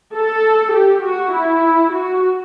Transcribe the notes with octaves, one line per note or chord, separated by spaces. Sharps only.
A4
G4
F#4
E4
F#4